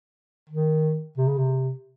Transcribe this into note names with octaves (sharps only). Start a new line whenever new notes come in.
D#3
C3
C#3
C3